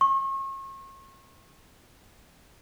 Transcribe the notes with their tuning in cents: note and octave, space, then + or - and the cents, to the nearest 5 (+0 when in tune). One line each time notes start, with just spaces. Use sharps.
C#6 -40